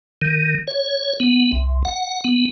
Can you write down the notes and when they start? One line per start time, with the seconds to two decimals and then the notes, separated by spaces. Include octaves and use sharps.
0.22 D#3
0.67 C#5
1.20 B3
1.52 C2
1.85 F#5
2.24 B3